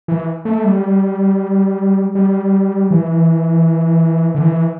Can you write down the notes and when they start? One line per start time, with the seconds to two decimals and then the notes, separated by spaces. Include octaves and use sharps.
0.08 E3
0.45 A3
0.64 G3
2.15 G3
2.91 E3
4.35 D3
4.41 E3